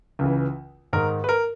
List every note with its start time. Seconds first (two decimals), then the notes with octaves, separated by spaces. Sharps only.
0.19 C#2 C#3 E3
0.93 G#2 D#3 A#4
1.24 B4
1.29 A#4